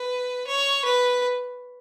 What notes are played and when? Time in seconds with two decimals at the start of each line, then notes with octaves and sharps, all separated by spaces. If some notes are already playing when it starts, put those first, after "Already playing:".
Already playing: B4
0.47 C#5
0.85 B4